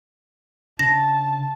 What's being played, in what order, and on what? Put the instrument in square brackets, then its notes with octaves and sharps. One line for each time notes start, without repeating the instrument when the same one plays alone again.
[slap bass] C#3 D4 [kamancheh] A5 [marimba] A#6